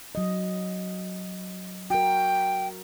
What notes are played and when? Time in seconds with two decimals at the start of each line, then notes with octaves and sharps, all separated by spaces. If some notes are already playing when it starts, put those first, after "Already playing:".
0.15 F#3 D#5
1.90 F#4 A#4 G5